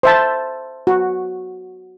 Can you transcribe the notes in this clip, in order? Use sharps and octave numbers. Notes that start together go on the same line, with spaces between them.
C5 E5 A5
F#4